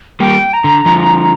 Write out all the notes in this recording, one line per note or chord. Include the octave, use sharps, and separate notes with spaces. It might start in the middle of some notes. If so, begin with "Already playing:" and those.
G3 A#3 G5
A#5
D3
D3 F3